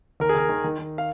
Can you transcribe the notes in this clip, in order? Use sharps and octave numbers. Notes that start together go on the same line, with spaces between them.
D#2 A#4
G#4
D#2 A#4
D#3
D#3
D#3
F5